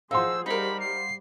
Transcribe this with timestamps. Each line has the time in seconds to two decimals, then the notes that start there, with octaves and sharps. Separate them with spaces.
0.11 F3 D#4 G#4 C5 F5 F#5 C6 E6
0.46 G3 D#4 A#4 C5 B5
0.80 C7